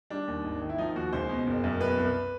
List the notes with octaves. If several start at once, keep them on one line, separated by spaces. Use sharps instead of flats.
G3 D4
D#2
G#1
D#3
E4
F3 D#4
D#2 F#4
C#2 C5
B2
F#1
F#2
B2 B4
C2